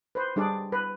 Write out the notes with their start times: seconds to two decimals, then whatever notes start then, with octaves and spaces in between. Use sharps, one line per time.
0.15 B4 C5
0.36 G3 D4 G#4 D5
0.72 B4